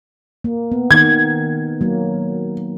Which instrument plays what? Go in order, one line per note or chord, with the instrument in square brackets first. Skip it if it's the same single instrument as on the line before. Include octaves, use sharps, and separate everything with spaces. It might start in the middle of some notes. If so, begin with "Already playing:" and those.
[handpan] A#3
B3
[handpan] D#3 A#3 [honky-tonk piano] G#6
[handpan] F#3 A#3